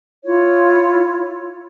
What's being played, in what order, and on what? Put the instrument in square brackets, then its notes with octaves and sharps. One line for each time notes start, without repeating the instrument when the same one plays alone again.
[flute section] E4 F4 C#5